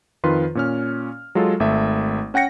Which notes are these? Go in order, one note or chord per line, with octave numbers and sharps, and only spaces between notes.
F2 D#3 F4 B4 C6
A#2 C#4 F6
F#3 G#3 F4 A4
G#1 A3 E5
C#4 F#5 G5 A#6 C#7